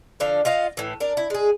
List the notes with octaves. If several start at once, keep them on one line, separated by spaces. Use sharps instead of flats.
D3 F3 D4 F5
F4 D#5 F5 F#5
A2 E3
D4 A#4
E4
G#3 G#4